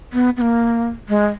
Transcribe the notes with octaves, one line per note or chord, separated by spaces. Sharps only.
B3
B3
A#3
G#3